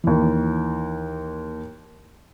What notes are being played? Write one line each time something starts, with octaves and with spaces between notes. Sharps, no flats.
D#2 E3